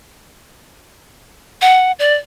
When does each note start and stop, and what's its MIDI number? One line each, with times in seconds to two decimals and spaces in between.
1.62 1.92 78
1.99 2.14 74